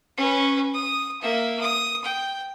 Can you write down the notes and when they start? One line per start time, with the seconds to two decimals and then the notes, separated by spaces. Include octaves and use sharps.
0.17 C#4 B4
0.75 D#6
1.22 A#3 E5
1.61 D#6
2.05 G5